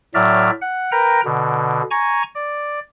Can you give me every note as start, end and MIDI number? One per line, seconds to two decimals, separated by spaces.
0.14 0.51 45
0.14 0.51 54
0.14 0.51 74
0.14 0.51 76
0.14 0.51 89
0.62 0.91 78
0.92 1.21 70
0.92 1.21 71
0.92 1.21 79
0.92 1.21 82
1.25 1.82 47
1.25 1.82 50
1.91 2.23 80
1.91 2.23 82
1.91 2.23 85
2.35 2.80 74